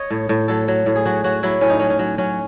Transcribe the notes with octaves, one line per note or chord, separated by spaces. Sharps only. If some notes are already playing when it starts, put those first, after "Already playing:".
Already playing: C#5 D#5
A2
A2
F#3 A4
F#3
A2
G#4
F#3 F#4
F#3 F#4
F#3 E4
A2 C#4
D#4
F#3 C#4
C#4
F#3
F#3 C#4